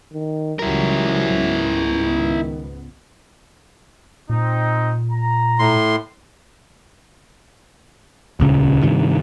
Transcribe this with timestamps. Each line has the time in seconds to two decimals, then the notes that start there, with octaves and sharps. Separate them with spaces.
0.13 D#3
0.59 C#2 E3 F#3 G3 E4 A#4
1.33 C#2 G#2 B3
2.16 D#3
4.30 A#2 C4 D#4
5.11 A#5
5.59 A2 C6
8.40 D#1 C#2 C#3
8.83 G2 C3 D#3